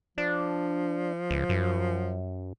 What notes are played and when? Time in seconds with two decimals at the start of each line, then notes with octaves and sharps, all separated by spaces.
0.18 F3 D4
1.31 C#2
1.49 F#2